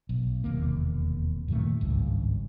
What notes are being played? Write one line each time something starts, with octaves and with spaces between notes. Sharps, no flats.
B1
E1 D#2 C3 A#3
F#2 A#2 D#3 A3
G#1 C#2 G2